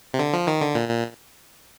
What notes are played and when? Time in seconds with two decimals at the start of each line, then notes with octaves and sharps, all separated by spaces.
0.14 C3
0.19 D3
0.33 F3
0.47 D#3
0.61 D3
0.75 A#2
0.88 A#2